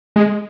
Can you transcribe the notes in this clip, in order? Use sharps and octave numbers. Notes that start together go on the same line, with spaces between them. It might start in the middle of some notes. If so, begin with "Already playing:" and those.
G#3